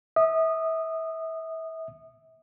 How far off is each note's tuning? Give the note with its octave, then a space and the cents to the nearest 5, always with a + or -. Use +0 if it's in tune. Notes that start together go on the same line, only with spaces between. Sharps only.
E5 -30 D#6 -20